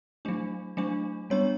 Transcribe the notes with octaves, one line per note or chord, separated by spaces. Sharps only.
F#3 A3 D4
F#3 A3 D4
G3 B3 D4 C#5